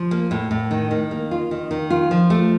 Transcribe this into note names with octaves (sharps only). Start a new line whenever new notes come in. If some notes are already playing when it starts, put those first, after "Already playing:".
Already playing: F3
A#3
A2
A2
D#3
D#3
A#3
F4
D#3
D#3
F4
F3
A3